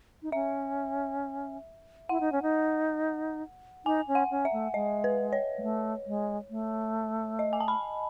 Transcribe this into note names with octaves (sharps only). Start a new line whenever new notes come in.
D#4
C#4 E5
E4 F#5
D#4
C#4
D#4
D#4 G#5
C#4
F#5
C#4
E5
A3
G#3 D#5
B4
C#5
G#3
A3
G#3
A3
D#5
G#5
A5
B5